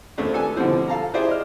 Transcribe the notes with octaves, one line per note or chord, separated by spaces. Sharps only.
D#2 A3 C4 D4
G4 A4 B4 G#5
B2 D3 F3 G3 C4 E4
A4 F5 A5 A#5
E4 G4 G#4 C5 D5 E5
D#5 F6